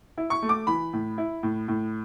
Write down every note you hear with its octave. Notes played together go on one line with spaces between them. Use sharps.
E4
C#6
A3
D6
E3 B5
A2
E4
A2
A2